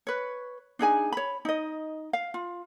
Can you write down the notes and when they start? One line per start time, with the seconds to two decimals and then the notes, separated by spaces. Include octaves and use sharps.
0.07 B4 C#5
0.79 D4 D#4 G#4 G#5
1.13 C#5 B5
1.45 D#4 D#5
2.13 F5
2.34 F4